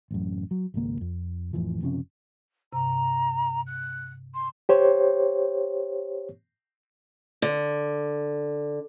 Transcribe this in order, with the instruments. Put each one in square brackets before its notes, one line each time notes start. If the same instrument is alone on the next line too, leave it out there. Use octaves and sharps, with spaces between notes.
[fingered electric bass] A1 F#2
F#3
G#1 C#2 A#3
F2
A1 F2 E3 F3
F#1 C3 F3 C#4
[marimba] G2 C3 [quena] A#5
[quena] F#6
C6
[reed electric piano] G4 C5 C#5
[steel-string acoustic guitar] D3